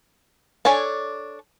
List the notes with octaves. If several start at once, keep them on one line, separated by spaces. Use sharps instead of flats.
D4 A4 C#5 G#5 A5